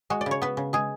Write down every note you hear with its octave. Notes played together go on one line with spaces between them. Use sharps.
G#3 F#4
D5
C#3
C#5
B3 B4
C#3
G#3 G#4